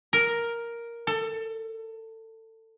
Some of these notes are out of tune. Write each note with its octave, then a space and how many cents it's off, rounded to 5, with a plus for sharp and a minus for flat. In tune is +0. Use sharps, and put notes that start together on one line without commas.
A#4 +5
A4 +25